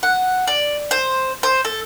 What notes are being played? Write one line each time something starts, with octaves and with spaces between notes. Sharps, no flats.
F#5
D5
C5
C5
A4